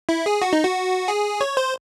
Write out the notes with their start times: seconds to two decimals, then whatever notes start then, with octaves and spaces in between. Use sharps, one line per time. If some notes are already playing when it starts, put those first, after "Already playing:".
0.09 E4
0.26 G#4
0.42 F#4
0.53 D#4
0.64 F#4
1.08 G#4
1.41 C#5
1.57 C5